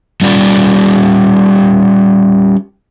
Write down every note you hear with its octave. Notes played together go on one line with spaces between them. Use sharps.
G3 C#4 F4 G4 D5